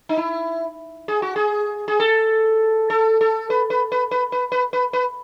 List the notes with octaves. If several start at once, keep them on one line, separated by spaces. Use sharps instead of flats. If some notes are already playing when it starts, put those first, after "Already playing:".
D#4
E4
G#4
F#4
G#4
G#4
A4
A4
A4
B4
B4
B4
B4
B4
B4
B4
B4